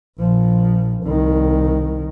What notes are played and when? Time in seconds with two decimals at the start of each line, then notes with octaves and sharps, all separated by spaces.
0.19 A#1 F3
1.03 C2 D#3